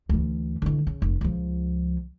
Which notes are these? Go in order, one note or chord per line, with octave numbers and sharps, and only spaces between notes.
D2 E3
D3 E3
C#3
F1
C#2 F3